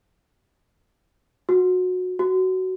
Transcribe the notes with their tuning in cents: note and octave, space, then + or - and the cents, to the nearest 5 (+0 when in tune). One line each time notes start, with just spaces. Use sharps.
F#4 -20
F#4 +15